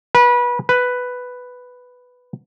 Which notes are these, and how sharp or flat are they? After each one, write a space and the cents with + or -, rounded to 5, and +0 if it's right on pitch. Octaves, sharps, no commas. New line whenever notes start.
B4 -25
B4 +5